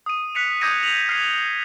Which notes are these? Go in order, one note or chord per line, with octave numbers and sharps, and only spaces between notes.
D#6 D#7
F#6 B6 C#7 D#7 F7
D6 D#6 G6 G#6 A#6 D#7
D#6 F7 F#7
F6 G#6 C7 D#7